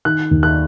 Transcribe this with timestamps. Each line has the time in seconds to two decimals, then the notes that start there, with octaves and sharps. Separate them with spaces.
0.05 D#3 F#6
0.31 D#2
0.43 F#6